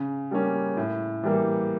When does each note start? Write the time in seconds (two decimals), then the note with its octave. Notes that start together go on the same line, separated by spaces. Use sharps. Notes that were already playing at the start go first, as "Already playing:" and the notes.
Already playing: C#3
0.31 G3 A#3 C#4
0.77 A2
1.23 E3 G3 A#3